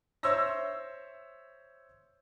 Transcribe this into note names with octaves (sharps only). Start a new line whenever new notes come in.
C5 C#5 E5 C6 E6 A#6